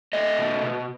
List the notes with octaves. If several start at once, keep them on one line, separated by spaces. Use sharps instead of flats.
A3 D#5
B2
B2